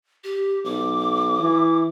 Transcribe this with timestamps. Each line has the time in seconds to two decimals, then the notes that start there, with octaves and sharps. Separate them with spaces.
0.24 G4
0.65 B1 D6
1.39 E3